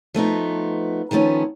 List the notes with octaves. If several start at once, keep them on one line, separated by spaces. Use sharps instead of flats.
F3 A3 B3 D#4
D#3 F3 A3 B3 C#4